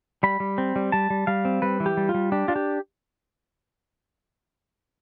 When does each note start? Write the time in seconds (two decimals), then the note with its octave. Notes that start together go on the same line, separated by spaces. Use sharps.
0.23 G3 B5
0.40 G3
0.58 C4
0.76 G3
0.92 G3 A5
1.10 G3
1.27 G3 F5
1.45 C4
1.62 G3 B4
1.80 E3
1.86 G4
1.97 G3
2.09 F4
2.14 G3
2.32 D4 G4
2.48 D4 F4
2.56 G4